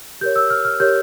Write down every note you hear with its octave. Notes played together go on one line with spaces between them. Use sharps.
G4 A#4 C#5 G6
E6
F6
F6
G4 A#4 C#5 G6